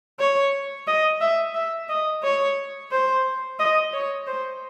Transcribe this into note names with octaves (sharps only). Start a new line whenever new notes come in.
C#5
D#5
E5
E5
D#5
C#5
C5
D#5
C#5
C5